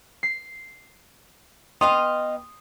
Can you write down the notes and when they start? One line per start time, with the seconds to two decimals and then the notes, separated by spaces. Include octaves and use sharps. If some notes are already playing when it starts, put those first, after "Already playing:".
0.23 C7
1.81 B3 D#5 F5 G5 C6 D#6